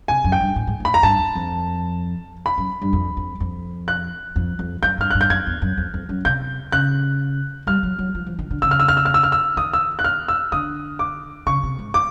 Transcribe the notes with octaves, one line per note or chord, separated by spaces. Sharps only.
C3 G#5
F#2
G5
G2
A2
G#2
A2
B5
A#5
G2 A5
F2
F2
B5
F#2
G2
F2
F2
F2
F#6
F2
F2
F#2 G6
G2 F6
G2 F#6
G6
F#2 G#6
E2
F#2
F2
F2
F#2
C3 G6
C#3 F#6
G3 F6
F#3
F#3
F3
F3
D#3
D3
C#3 E6
F6
E6
F6
E6
F6
E6
F6
E6
D#3 D#6
E6
F#6
F6
E6
D3 D#6
D6
C#3 C#6
C3
G#2
D6